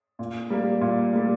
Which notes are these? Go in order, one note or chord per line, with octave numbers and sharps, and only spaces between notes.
A#2
G3 A#3
A#2
G3 A#3